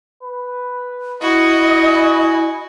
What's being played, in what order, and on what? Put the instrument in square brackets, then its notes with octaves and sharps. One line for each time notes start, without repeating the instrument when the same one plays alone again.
[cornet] B4
[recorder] E4 [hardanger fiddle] F#4 [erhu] D#5
[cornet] G#5